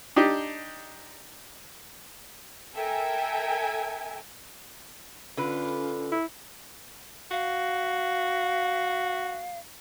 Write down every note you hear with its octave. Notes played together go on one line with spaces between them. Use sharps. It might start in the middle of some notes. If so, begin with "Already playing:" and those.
D4 D#4 G4
A4 A#4 E5 G5 G#5
D3 C#4 F4 B4
E4
F#4 F5